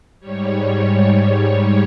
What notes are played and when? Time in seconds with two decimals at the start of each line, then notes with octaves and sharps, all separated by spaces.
0.20 G#2 G3 C#5
0.96 C#5